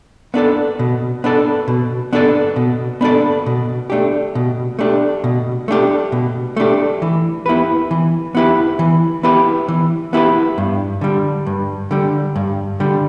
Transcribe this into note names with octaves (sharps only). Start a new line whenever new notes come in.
B3 D4 A4 D5
B2
B3 D4 A4 D5
B2
B3 D4 A4 D5
B2
B3 D4 A4 D5
B2
A3 D4 G4
B2
A3 D4 G4
B2
A3 D4 G4
B2
A3 D4 G4
E3
B3 E4 G4 B4
E3
B3 E4 G4 B4
E3
B3 E4 G4 B4
E3
B3 E4 G4 B4
G2
D3 G3
G2
D3 G3
G2
D3 G3